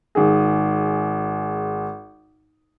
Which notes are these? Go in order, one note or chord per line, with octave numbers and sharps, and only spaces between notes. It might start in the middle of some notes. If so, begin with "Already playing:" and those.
G#1 G#4